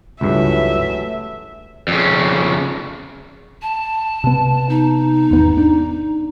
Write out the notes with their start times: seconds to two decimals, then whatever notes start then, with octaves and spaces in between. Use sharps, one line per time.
0.21 C#2 G2 E3 F#3 A3 E5
1.88 F2 C#3
3.61 A5
4.24 C3 B3
4.69 D#4
5.31 G#1 E2 B3
5.57 D4